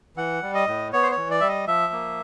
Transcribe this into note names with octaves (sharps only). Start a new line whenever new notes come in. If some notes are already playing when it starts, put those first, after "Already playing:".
E3 F#5
G3
D#5
A2
B3 C#5
C5
C#5
E3
D5
G3 E5
D#5
F3 E5
A#3